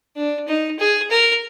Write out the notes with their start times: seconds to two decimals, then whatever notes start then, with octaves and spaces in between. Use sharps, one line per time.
0.17 D4
0.48 D#4
0.79 G#4
1.11 A#4